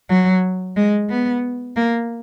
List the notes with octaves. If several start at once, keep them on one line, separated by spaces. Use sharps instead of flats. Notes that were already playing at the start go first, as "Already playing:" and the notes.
F#3
G#3
B3
A#3